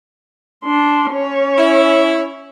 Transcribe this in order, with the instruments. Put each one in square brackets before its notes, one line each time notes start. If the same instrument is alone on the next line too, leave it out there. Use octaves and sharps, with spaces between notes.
[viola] D4 C6
C#4 C#5
[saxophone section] E4